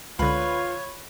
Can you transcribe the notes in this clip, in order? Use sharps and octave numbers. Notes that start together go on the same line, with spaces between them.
C#2 D3 F4 B4 C#5